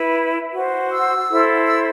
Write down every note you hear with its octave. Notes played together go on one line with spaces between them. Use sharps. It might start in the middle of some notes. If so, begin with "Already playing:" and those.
Already playing: E4 B4
F#4 C5
E6
E4 A4 C5
E6